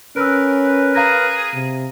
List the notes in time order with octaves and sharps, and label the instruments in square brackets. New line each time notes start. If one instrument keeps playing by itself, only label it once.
[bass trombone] C#4 [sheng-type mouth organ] A#4 B4 [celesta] E6 F#6 D7
[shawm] G#4 [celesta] F5 A#5 A#6
[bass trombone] C3